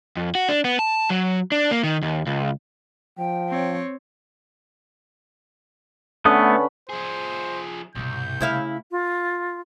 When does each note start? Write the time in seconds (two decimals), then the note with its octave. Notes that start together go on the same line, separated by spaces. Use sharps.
0.17 F2
0.35 F#4
0.49 D4
0.65 B3
0.79 A5
1.10 F#3
1.52 D4
1.71 A#3
1.84 D#3
2.02 D#2
2.27 C#2
3.18 F3 G5
3.49 C4 C#5
6.25 D3 A3 B3 C#4 B4 D#6
6.89 F3 G#4 C5
7.95 C2 G2 B2 G6
8.41 C#3 A3 E4 F5
8.91 F4